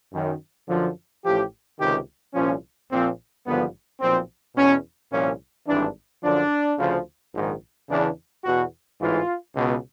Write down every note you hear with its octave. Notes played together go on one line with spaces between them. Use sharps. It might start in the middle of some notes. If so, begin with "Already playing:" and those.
F#2 D#3
F#2 D3 F3
A1 A2 F3 G4
C#2 C3 D#3 G4
C2 A#2 F3 C#4
A#1 A#2 F3 C4
G#1 G2 D3 F3 B3
B1 A#2 F3 C4
E2 B2 C#4
C2 A#2 F3 C#4
G#1 G2 E3 D4
F#2 D3 F3 D4
D2 C#3 F3
A#1 G#2 D#3
E2 C#3 E3 D4
E2 B2 F#4
A1 G#2 E3 F4
C#2 B2